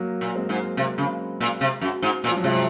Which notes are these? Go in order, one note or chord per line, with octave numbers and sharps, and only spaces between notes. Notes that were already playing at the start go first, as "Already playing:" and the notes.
Already playing: F#3 A#3
A#2
G#3 C4
G#2
C3
C#3
A#2
C3
F#2
G#2
A#2
F3
F#3
C3 F3 G#3